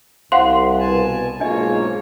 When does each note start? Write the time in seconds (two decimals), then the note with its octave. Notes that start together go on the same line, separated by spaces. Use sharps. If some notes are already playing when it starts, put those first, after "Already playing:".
0.32 C2 C5 F5 F#5 C6
0.79 B2 G#5 A5
1.40 B1 G#2 A#3 D4 F4 G#4 C#5 D#5